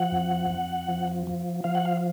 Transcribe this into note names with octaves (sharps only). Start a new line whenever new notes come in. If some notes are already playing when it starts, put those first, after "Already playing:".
Already playing: F3 F#5
F2
F2
F3
F3
F3 F5
F#5
F5